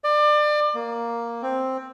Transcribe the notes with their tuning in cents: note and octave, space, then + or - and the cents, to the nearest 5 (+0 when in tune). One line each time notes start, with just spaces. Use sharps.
D5 +30
A#3 +5
C4 +5